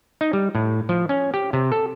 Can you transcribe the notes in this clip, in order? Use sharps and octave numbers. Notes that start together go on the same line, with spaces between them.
D#4
G3
A2
F3
C#4
G4
C3
A4